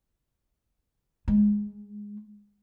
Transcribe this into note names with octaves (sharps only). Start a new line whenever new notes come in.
G#3